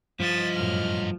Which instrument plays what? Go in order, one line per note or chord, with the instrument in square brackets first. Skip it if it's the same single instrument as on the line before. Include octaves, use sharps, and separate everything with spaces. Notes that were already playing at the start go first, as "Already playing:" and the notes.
[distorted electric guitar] G2 D#5 [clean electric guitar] F3 [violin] A6 B6
[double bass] F#2 A2 [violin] F6